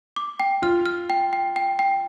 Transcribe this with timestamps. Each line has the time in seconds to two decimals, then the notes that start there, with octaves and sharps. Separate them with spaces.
0.16 D6
0.40 G5
0.62 F4 F6
0.86 F6
1.10 G5
1.33 G5
1.56 G5
1.79 G5